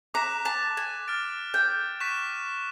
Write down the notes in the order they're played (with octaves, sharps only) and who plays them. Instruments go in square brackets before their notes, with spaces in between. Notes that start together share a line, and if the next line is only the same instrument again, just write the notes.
[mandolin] A#5 [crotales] D6 F#6 B6 E7
[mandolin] A5
G#5
[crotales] F6 A6 D7
[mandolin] G5
[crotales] C#6 F#6 B6 E7